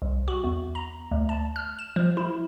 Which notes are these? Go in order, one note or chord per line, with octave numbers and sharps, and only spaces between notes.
C2
F#4
E2
A#5
D2
A5
F6
E7
F3
E4